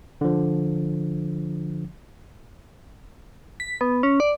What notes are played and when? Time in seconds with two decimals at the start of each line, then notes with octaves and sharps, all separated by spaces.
0.21 D3 F3
3.60 B6
3.81 B3
4.03 C#4
4.20 D5